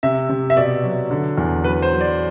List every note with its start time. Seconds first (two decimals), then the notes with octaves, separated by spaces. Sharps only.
0.03 C3 E5
0.29 C3
0.50 E5
0.57 B2 D5
0.84 F#3
1.11 D3
1.38 E2
1.64 F#3 B4
1.82 C5
1.92 F#3
2.01 D5